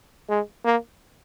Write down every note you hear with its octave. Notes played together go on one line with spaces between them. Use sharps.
G#3
A#3